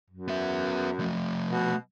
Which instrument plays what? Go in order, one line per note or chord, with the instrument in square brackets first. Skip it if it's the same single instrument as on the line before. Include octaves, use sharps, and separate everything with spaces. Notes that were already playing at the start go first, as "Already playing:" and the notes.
[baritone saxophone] F#2
[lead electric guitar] B3 E5
F3 A3
[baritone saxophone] B2